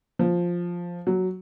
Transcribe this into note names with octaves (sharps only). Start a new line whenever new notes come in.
F3
F#3